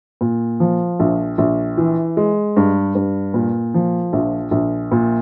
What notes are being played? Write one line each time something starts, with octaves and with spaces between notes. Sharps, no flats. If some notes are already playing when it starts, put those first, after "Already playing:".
A#2
F3
A#1
A#1
E3
G#3
G2
G2
A#2
F3
A#1
A#1
A#2